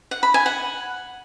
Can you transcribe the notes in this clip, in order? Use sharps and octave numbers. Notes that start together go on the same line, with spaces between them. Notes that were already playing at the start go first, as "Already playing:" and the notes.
F#5
B5
G#5
F#5